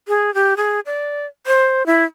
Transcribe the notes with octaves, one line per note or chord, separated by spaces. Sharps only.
G#4
G4
G#4
D5
C5
E4